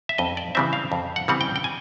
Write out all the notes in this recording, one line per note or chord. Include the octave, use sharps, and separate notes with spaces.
E5
F2 D#5
D5
C#3 E3 G3 C4 E5
F5
F2
F#5
C#3 E3 G3 C4 F#5
G5
G5
G#5